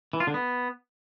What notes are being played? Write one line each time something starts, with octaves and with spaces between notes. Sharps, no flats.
E3
F4
D3
B3